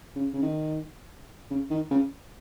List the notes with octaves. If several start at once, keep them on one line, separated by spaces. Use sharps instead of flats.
C#3
C#3
D#3
C#3
D#3
C#3